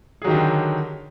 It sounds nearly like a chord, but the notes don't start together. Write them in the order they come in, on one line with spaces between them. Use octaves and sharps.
G#4 F#3 D#3 G4 D3